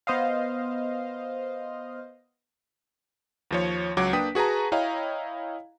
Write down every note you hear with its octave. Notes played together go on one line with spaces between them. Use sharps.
B3 C5 D#5 F5
D#2 F3 C#5
C#2 F#3 F#5 D6 D7
A#3 D4 B4 G5 D#6 B6
F#4 G#4 B4 A5 A#5
E4 C#5 D#5 F5 G5 A#5